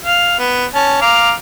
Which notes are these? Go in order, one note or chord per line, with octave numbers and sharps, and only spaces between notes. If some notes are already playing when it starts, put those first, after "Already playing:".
F5
B3
C#4 A5
F5 A#5 D6